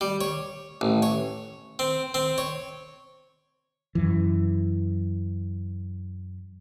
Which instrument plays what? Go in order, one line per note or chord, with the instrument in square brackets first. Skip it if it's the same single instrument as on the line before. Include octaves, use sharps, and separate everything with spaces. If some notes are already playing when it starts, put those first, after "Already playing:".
[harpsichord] G3
C#5
A1
C#5
C4
C4
C#5
[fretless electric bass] F#2 E3